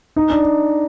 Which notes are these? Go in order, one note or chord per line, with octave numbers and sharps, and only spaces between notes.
D#4
D4